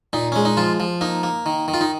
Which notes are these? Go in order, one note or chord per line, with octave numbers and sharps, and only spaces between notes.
A#2 D#4
G#3 C#4
D#4
F3 F4
F3
A#3 D#4
A#3
D#3
D#3
F4
D#4